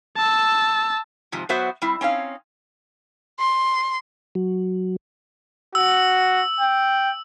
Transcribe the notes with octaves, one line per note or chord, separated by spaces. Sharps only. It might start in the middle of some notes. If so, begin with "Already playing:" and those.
A5 E6
G#2 C3 F3
F#3 B3 F#4 C5 E5
G3 C4 E4
C4 C#4 D#4 F5
C6
F#3
F#4 E6
G5